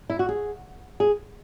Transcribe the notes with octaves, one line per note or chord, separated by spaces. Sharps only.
E4
F#4
G#4
G#4